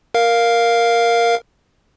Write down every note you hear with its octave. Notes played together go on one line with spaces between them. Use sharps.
A#4 F5